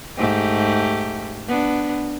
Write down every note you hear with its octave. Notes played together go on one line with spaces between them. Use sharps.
G#2 A3 G4
B3 D4